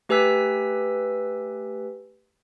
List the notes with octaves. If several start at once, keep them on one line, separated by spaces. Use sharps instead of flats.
A3 G4 B4 G#5 E6 B6